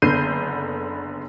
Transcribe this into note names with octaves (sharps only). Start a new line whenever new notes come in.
F#1 D3 B3 G6 C7 D#7